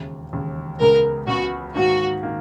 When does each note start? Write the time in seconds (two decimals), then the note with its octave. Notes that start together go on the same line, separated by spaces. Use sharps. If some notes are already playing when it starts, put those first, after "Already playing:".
Already playing: E1 D#2 C#3
0.33 E1 D#2 C#3
0.80 C#2 C#3 G#3 B3 A#4
1.27 C#2 C#3 G#3 B3 F#4
1.75 G#2 D#3 A#3 F#4
2.23 D#3 A#3